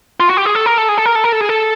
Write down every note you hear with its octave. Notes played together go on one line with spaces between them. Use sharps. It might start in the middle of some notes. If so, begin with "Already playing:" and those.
F4
F#4
G4
G#4
A4
A#4
A4
G#4
A4
A#4
A4
A#4
A4
G#4
A4